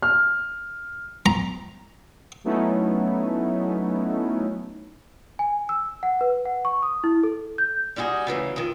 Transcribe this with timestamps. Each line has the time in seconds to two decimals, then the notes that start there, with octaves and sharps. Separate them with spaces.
0.03 F6
1.26 A#5
2.44 F#3 A3 B3 C#4 D#4 E4
5.39 G#5
5.69 E6
6.03 F#5
6.21 B4
6.45 F#5
6.65 C#6
6.83 D#6
7.04 E4
7.23 A4
7.58 G6
7.96 G3 D#4 E4 F#4 G#4
8.27 C#3 E3 F#3 A3
8.56 F2 D#3